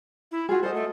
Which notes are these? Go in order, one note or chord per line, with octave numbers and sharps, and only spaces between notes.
E4
F4 F#4 G#4
A4 C5 D#5
A3